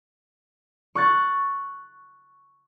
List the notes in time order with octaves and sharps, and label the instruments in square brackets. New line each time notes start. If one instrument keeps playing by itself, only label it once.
[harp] C#6 F#6 A6